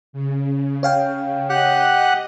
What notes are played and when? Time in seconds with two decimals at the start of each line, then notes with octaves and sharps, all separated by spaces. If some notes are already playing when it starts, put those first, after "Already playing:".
0.13 C#3
0.83 C#5 F5 G5
1.50 G4 D#5 F#5 F#6